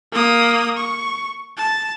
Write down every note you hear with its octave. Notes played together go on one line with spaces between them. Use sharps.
A#3 D#6
C#6
A5